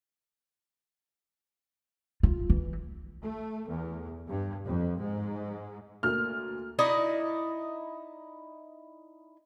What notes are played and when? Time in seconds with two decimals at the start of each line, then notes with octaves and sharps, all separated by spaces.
2.23 F4
2.50 E3
3.22 A3
3.68 E2
4.28 G2
4.64 F2
4.99 G#2
6.03 D2 A#3 F6
6.79 D#4 E4 D5 D#5